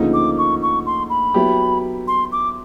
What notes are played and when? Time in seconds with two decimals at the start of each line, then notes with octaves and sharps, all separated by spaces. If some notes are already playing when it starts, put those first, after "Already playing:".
Already playing: D2 C#3 F3 A#3 D#4
0.14 D6
0.38 C#6
0.62 C#6
0.86 C6
1.10 B5
1.34 F#3 B3 E4 G4
2.08 C6
2.32 D6